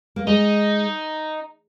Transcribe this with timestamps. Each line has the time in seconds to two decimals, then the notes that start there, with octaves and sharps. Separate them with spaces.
0.16 A#3
0.27 G#3 D#4